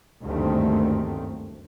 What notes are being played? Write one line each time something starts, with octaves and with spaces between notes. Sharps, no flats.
F#1 D2 G2 D#3 A3 C4